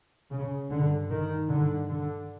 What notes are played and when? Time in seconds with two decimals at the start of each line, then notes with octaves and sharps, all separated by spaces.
0.31 C#3
0.70 G2 D3
1.10 D#3
1.49 G2 D3
1.89 D3